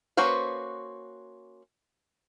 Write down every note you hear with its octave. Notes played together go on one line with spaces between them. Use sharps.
A#3 C#4 F#4 B4 C5